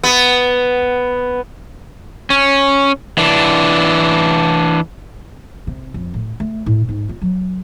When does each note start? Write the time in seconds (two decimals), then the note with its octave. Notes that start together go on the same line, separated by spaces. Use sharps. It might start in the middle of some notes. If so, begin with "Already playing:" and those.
0.03 B3
2.30 C#4
3.18 E3 D4
5.67 C3
5.94 F2
6.14 A2
6.40 A3
6.66 A2
6.89 G#2
7.09 F4
7.22 F#3